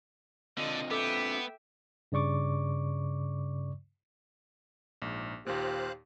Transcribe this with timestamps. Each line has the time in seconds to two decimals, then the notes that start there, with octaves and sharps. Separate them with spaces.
0.58 D3 C4 D4 F4 D#5
0.91 B3 A4 E5 G5 D6 E6
2.12 G2 C#3 D5 C#6 D6
5.02 A#1 G#2
5.46 D#2 A#2 G4 C5 F5 F#6